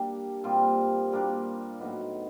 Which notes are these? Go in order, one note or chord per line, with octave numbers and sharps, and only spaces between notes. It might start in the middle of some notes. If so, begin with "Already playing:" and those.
Already playing: G3 A#3 D4 G4
A#2 G3 C4 F4
G3 A#3 D4
A2 F#3 B3 D#4